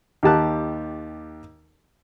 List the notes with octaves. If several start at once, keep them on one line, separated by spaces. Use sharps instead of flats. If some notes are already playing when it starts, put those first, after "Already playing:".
D#2 G4 A5 F#6